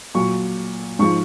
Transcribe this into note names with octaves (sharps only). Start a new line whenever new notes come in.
A#2 F#3 C#6
G#2 F3 C#6